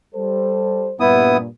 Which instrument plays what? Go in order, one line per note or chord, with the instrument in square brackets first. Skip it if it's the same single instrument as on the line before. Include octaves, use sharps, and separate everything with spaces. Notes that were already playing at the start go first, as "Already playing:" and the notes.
[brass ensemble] G3 A4 C5
[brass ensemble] G2 A#2 [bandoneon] B3 E4 D#6